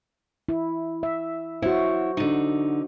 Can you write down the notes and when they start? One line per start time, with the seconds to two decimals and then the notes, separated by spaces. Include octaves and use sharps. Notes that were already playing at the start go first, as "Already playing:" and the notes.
0.49 E4
1.03 E5
1.62 E4 F#4 C5 C#5
2.17 D3 D#4